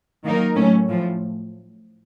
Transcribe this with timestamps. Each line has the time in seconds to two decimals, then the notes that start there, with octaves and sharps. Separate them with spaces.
0.24 D#3 F#3 A#3 D#4 A#4
0.55 A2 F#3 A3 C#4
0.88 A2 F3 A3